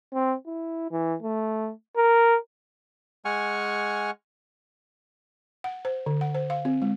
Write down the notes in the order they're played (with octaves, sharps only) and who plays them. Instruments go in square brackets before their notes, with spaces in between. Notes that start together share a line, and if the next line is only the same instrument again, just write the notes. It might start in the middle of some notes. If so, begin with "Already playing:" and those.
[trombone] C4
E4
E3
A3
A#4
[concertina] G#3 F#5 G#5 C#6 F6
[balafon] F#5
C5
D3
F#5
C5
F5
C4
G#3